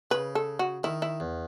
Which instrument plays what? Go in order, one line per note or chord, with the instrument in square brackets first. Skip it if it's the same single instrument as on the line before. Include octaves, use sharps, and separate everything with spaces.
[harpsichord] C#3 [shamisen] B4
[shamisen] A4
F#4
[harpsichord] D#3 [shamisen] E4
[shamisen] E4
[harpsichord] E2